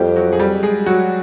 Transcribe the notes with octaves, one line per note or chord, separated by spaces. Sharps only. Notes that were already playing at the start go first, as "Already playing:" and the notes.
Already playing: F2 G3 G4
F#3 F#4
G#4
G3 G4
G#3 G#4
F#3 F#4